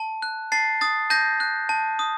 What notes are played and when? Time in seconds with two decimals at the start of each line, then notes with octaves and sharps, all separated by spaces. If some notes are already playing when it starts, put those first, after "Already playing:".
Already playing: A5
0.22 F#6
0.52 A5 A6 C7
0.81 D#6 A6
1.10 A5 G6 A#6
1.40 F#6
1.69 A5
1.99 D#6